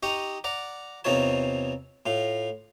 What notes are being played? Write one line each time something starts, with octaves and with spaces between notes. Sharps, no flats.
D#4 G4 D#5 A#5 C#6
D5 F#5 A#5
E2 C3 D#4 F4 C#5 A5
A2 F4